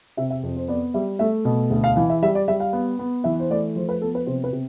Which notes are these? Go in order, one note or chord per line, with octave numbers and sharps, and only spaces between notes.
C3 E5
E5
F2
C5
B3 D5
G3 E5
A3 E5
B2
D2
F5
E3 F5
E5
G3 E5
D5
G3 E5
F5
B3
B3
E3 E5
C5
A3 D5
F3 C5
B4
B3 A4
B4
C3 C5
B4
C3